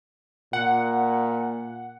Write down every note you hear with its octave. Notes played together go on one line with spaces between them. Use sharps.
A#2 F#5